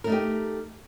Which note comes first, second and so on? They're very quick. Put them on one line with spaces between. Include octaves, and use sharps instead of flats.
A#4 A3 D#4 G4